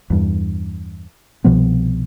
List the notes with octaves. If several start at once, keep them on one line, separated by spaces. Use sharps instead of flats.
E2 G2
C2 B2 F3 B3